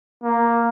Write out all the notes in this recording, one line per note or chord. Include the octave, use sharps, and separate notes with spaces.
A#3